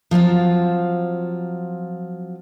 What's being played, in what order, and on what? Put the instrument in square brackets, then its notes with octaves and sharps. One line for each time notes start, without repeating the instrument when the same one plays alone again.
[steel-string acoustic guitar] F3 F#3 C4 F4